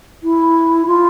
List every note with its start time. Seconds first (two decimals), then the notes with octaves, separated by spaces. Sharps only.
0.23 E4
0.87 F4